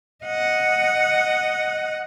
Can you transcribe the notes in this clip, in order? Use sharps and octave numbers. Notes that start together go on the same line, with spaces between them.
D#5 F#5